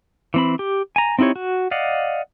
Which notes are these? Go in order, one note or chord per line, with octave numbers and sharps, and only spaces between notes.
E3 C4 B5
G4
G#5 A#5
C4 D#4 E4 G4 C#5
F#4
D5 D#5 F5 F#5